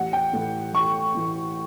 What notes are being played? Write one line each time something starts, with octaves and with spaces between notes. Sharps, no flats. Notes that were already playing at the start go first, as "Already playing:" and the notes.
Already playing: A1 F#5
G5
A2 E3
A1 C#6
A2 E3